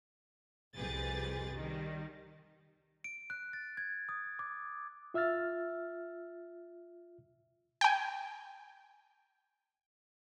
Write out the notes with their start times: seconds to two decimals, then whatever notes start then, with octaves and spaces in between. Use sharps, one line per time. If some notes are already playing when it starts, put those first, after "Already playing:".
0.76 C2 F2 G4 G#4 B4 A6
1.55 D#3 G3
3.04 D7
3.30 F#6
3.53 A6
3.77 G#6
4.09 D#6
4.39 D6
5.14 F4 E5 E6 F6 A6
7.81 G5 G#5